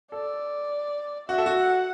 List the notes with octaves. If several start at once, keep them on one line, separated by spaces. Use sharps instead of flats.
A4 D5
F#4 E5
A4
F#4
F#5